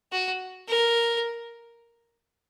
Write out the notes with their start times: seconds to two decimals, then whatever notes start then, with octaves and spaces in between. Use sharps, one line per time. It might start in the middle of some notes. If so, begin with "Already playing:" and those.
0.12 F#4
0.68 A#4